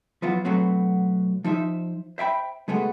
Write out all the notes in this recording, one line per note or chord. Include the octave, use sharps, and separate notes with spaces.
F3 F#3 B3 F4 F#4
B2 F#3 A3 B3 C4 F#4
F3 D#4 C5 E5
C5 E5 G5 B5
C#3 G#3 A3 B3 F#4